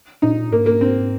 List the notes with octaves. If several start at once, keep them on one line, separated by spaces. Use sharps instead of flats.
A#2 D#4
G#2 A#3
A#3
C4